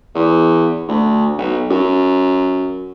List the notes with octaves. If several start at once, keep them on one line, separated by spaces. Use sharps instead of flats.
E2
D2
B1
F#2